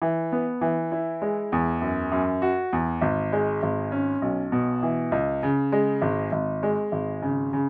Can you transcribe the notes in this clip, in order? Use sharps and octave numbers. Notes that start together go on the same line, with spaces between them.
E3
B3
E3
E4
G#3
E2
F#2
F#2
F#4
E2
G#1
G#3
G#1
C#4
B1
B2
E3
C#2
C#3
G#3
G#1
G#1
G#3
G#1
C#3
C#3